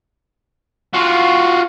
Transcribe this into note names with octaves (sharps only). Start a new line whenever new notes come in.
F4 F#4